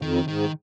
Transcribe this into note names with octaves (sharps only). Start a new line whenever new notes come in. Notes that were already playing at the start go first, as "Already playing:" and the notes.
F2 D#3
G#2 D#3